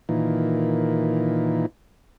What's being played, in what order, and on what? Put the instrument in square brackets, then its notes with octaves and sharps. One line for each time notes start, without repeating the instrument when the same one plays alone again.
[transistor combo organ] A#2 D#3 E3